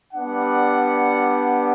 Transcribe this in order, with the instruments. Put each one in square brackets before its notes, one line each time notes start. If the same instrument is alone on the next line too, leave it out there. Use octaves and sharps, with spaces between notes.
[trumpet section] G3 B3 D4 F#5